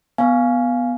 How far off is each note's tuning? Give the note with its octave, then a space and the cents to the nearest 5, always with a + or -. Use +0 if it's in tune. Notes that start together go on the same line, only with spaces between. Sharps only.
B3 +0 F5 +0 G#5 +0